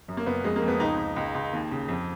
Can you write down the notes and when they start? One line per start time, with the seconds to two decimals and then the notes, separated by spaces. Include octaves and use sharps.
0.08 F#2
0.17 A#3
0.26 F#1 B3
0.44 F2 G#3
0.56 A#3
0.62 F2
0.68 B3
0.80 C#2 D#4
0.98 C#2
1.16 C#2
1.35 C#2
1.53 D#2
1.71 C#3
1.88 F2